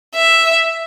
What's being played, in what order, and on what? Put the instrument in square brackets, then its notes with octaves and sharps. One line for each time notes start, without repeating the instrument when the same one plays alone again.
[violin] E5